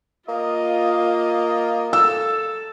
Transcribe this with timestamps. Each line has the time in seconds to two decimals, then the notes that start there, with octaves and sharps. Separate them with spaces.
0.29 A#3 F4 D#5
1.93 A4 E6